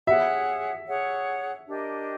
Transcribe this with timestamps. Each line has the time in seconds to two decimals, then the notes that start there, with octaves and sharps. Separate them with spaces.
0.07 G#4 C#5 E5 F#5
0.87 G#4 C#5 F#5
1.67 D4 G4 A#4 D#5